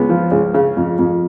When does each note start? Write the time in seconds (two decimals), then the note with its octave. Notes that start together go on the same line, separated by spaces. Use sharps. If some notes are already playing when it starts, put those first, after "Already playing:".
Already playing: C#2 B3
0.09 F3
0.31 C#2
0.54 C#3
0.77 F2
0.99 F2